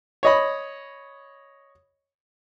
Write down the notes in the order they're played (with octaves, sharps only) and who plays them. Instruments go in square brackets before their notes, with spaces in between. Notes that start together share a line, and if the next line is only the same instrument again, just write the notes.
[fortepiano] C#5 D#5 B5